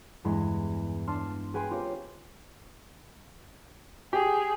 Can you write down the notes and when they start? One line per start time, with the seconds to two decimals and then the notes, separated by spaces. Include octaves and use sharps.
0.24 E2 G2 G#3 B5
1.07 D4 A5 C6 F6 E7
1.54 G#4 B4 G5 G#5 B5 C6
1.70 C4 C#4 F4 G4 A#4 C#5
4.13 G4 G#4